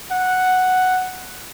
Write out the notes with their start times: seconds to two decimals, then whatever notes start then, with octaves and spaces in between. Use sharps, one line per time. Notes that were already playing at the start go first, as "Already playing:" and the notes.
0.11 F#5